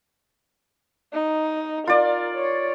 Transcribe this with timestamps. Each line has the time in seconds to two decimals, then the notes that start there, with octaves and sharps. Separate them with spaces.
1.13 D#4
1.87 F4 A#4 D5
2.35 C#5